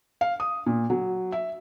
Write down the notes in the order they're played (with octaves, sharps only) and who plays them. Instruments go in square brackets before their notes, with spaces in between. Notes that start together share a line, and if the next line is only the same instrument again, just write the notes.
[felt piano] F5
D#6
A#2
F#3
E5